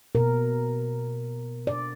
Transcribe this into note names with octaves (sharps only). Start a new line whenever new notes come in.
B2 A#4
D5